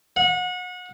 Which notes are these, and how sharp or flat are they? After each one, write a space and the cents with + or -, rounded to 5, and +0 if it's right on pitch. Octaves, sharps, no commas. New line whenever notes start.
F#5 -30